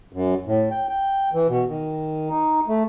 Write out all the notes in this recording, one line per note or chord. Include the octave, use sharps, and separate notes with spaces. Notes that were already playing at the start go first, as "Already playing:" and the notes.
F#2
A2
G5
G5
E3
B2
D#3
D#4
A3